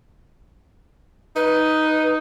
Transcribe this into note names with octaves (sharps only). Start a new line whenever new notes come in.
D#4 B4